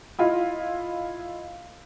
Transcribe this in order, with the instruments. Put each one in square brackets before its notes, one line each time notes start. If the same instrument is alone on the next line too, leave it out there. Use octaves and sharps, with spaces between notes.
[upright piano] E4 F4 D#5